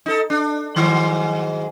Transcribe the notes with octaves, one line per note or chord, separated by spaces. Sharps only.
D#4 A4
D4
G#2 D#3 F#3